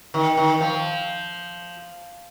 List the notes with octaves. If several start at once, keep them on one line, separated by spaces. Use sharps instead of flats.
D#3
D#3
F3